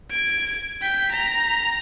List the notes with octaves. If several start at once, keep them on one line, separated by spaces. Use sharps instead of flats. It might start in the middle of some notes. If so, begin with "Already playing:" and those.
G#6 D7
G5 B6
A#5